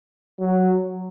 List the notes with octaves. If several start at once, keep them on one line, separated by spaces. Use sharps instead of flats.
F#3